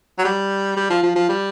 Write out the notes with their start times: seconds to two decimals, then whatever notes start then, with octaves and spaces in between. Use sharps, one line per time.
0.19 F#3
0.25 G3
0.77 G3
0.90 F3
1.03 F3
1.15 F3
1.29 G3